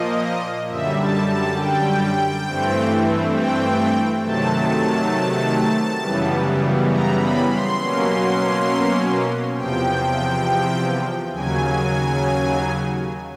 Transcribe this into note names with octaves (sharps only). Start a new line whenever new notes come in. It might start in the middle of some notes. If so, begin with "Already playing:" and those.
Already playing: A#2 F3 A#3 D#5
F#2 D3 G3 E5
A5
A5
G5
G2 E3 A3 C4
G5
C3 D#3 F#3 A3 A5
F#2 C#3 E3 G3 B3
A#5
B5
C6
B2 F#3 A#3 C#4
E2 C3 F3 G5
D#2 C#3 F#3 G#5